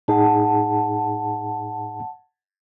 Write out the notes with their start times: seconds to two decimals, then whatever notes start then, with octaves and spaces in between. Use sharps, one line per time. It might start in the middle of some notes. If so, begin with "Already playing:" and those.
0.08 A2 D#4 G#4 F#5 A5